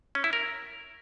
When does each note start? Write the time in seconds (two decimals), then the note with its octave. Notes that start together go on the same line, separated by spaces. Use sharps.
0.15 C#4
0.24 E4
0.33 A#4